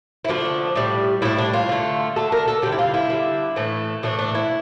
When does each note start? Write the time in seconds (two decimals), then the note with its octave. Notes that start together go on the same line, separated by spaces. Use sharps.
0.25 E4
0.28 D3 F3 A3 D4
0.76 A2 G3
1.22 A2 G3 E4
1.38 D4
1.54 F4
1.69 D3 A3
2.16 D3 A3 A4
2.32 A#4
2.48 A4
2.62 D3 G3 G4
2.72 E4
2.79 F4
2.94 E4
3.10 D3 G3
3.56 A2 E3 A3
4.03 A2 E3 A3 D4
4.19 D4
4.35 E4